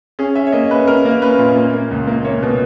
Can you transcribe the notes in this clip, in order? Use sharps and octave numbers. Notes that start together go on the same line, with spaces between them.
C#4 G#4
C#4 E5
C#5
A#3 D#5
C#4 B4
C#4 A#4
A#3
C#4 B4
A#2
A#3
A#3
C#2
A#3
A#3 C#5
B2